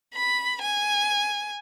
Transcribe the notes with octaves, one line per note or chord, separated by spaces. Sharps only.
B5
G#5